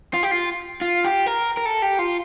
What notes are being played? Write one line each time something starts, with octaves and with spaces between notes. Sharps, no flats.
F4
G4
F4
F4
G4
A#4
A#4
A4
G4
F4